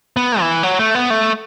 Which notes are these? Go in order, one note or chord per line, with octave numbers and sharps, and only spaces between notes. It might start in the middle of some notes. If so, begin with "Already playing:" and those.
B3
E3
F#3
A3
B3
A3